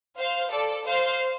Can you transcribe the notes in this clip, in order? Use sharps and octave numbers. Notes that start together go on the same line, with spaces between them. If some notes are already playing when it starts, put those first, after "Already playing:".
C5 F5
A4 D5
C5 F5